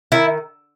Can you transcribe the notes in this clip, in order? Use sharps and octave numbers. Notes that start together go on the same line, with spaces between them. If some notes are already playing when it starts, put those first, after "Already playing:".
D#3 E4